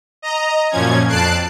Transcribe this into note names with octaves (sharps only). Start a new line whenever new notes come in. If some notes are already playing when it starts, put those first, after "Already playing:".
D#5 A#5
F#2 A#2 F3 C#4 G#6
F2 A5 F#6 C7 D7